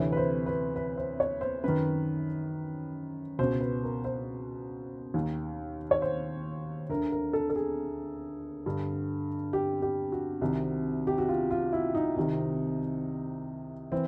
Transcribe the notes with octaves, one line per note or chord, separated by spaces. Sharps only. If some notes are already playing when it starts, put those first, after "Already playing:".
Already playing: D2 C3 E3 C#5
B4
C5
B4
B4
C5
C#5
C5
F#2 D#3 B4
C#2 B2 C5
B4
A#4
C5
D#2 D#3
C#5
C5
D2 D3 A#4
A#4
A4
A4
G#4
G2 D3
G4
G4
F#4
C2 C3 D#3
G4
F#4
F4
F4
E4
D#4
C2 C3 D#3
E3 C4